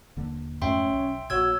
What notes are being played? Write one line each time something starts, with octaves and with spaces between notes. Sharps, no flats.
D#1 D3 A#3
F2 G#2 A3 C#4 E5 G5 C6
B1
A#1 A#2 F#4 C#5 E6 G#6